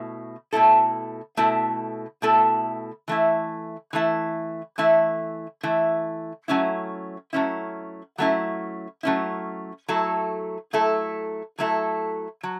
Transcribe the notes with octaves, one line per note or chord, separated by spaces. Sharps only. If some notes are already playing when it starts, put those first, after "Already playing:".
Already playing: B2 A3 E4
B2 A3 E4 A4
B2 A3 E4 A4
B2 A3 E4 A4
E3 A3 E4
E3 A3 E4
E3 A3 E4
E3 A3 E4
F#3 A3 C#4 E4
F#3 A3 C#4 E4
F#3 A3 C#4 E4
F#3 A3 C#4 E4
F#3 A3 E4 A4
F#3 A3 E4 A4
F#3 A3 E4 A4
F#3